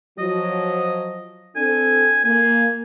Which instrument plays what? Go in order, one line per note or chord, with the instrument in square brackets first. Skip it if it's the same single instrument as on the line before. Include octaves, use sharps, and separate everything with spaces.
[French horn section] F3 F#3 [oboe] D#5
[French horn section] C4 D4 A4 [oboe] G#5
[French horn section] A#3 [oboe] G#5